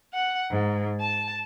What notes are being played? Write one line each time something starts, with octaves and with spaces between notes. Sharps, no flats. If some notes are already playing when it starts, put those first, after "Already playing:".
F#5
G#2
A5